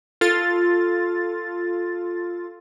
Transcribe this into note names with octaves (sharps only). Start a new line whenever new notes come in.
F4 A4 A6